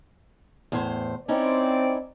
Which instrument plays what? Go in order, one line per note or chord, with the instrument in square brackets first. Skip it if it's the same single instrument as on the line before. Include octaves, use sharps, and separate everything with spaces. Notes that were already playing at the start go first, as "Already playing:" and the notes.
[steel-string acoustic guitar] E2 A2 C5
[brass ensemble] C4 D5 [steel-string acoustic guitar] C#4 D#4 E4